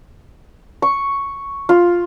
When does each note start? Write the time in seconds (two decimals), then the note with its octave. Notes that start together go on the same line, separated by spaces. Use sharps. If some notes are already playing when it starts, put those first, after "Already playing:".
0.82 C#6
1.69 F4